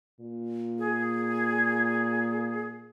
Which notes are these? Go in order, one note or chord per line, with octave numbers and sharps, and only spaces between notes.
A#2
G#4